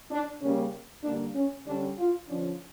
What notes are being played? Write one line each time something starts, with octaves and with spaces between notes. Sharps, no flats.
D4
C#3 G3 A#3 C#4
D3 G3 A#3 D4
C#4
D3 G3 C#4 D4
F4
D3 F3 C#4 D4